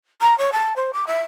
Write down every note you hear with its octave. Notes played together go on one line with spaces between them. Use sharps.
A#5
C#5
A5
C5
D6
E5